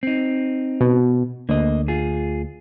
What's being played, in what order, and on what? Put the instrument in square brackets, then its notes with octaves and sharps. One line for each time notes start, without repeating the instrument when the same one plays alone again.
[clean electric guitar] C4 D#4
[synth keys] B2
[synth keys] D2 [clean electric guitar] A#3 D#5
[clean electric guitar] F4 G#4